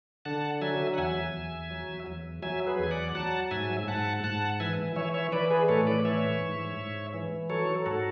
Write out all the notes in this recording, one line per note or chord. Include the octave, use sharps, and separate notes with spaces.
D3 F#5 A5
F#3 E5 G#5
F#5
E2 E5 G#5
E2
F#3
E2
F#3 E5 G#5
G#4 B4
E2 G#5
D5 F#5
F#3 F#5 A5
G#2 E5 G#5
G#2 F#5 A5
G#2 F#5 A5
E3 E5 G#5
E3 C#5 E5
C#5 E5
E3 B4 D5
G#4 B4
A2 A4 C#5
B4 D5
E3 C#5 E5
G#2
G#2
E3
F#3 A4 C#5
G#2 F#4 A4